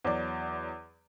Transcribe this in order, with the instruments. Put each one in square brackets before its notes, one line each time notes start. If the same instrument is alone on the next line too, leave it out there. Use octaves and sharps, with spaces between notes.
[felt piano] E2 F#3 D5